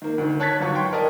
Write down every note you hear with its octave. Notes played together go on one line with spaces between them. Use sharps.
D#3 A#3
D2 D#3
C#5 A5 F#6 G#6 A6 B6
G1 F#3 C#6
G5 C6 C#6
A#4 D5 D#5 A5